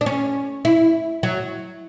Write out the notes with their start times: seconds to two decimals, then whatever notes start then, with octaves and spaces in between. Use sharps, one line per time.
0.01 D4
0.06 C#4
0.65 E4
1.23 F#3